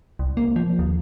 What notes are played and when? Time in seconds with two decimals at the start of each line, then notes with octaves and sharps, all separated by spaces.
0.19 C2
0.37 A#3
0.56 F3
0.79 D#2